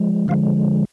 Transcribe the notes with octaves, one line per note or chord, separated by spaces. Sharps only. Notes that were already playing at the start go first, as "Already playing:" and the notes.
Already playing: F3 G#3
D3 F3 G#3 F5